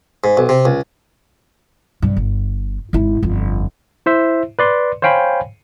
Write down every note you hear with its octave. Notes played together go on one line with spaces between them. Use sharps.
G#2
B1
C3
C#2
G2 C3
G1
G#1 E4
G1 F2
E4 C5 E5
B4 D5 C6
C5 C#5 F5 G5 G#5 B5